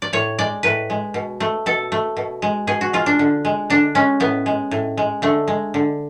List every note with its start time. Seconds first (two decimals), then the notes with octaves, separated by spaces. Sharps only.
0.02 D5
0.13 A2 C#5
0.38 G#3 D5
0.63 A2 B4
0.90 G#3
1.14 B2
1.40 A3
1.66 B2 A4
1.92 A3
2.17 B2
2.42 G#3
2.67 B2 G#4
2.81 F#4
2.93 G#3 F4
3.06 D4
3.19 D3
3.45 G#3
3.70 D3 D4
3.95 G#3 C#4
4.20 A2 B3
4.46 G#3
4.71 A2
4.97 G#3
5.22 D3 A3
5.48 G#3
5.74 D3